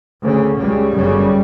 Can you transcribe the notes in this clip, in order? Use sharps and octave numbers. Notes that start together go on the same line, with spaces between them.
D2 C#3
C#2 C#3 G3
G1 F#2 C#3